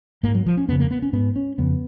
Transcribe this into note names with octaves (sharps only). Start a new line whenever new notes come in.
G#2 A#3
F#3
F3
C#4
F2 C#3 B3
A#3
B3
C#4
G#2 B3
C#4
F2 C#3 B3